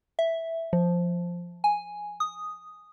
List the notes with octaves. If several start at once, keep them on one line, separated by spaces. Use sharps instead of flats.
E5
F3
G#5
D#6